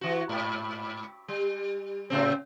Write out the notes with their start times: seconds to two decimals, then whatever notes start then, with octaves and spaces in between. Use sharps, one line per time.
0.01 E3 F#4
0.29 G#2
1.28 G3
2.10 A2 C#3 C4